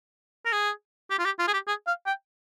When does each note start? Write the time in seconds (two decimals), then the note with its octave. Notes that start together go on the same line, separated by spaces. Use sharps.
0.46 A#4
0.53 G#4
1.11 G4
1.19 F4
1.25 G4
1.39 F4
1.48 G#4
1.54 G4
1.68 G#4
1.87 F5
2.07 G5